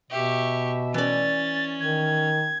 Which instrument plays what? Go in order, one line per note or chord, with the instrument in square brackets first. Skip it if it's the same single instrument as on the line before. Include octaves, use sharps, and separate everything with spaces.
[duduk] B2 [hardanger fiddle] G4 C#6 [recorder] E5
[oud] E3 D5 [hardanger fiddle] C#4 [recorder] A6
[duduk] D#3 [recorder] G#6